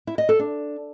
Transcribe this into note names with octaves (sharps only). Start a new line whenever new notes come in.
E4
D#5
A4
D4